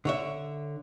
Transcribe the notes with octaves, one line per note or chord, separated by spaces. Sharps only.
D3 C#5 E5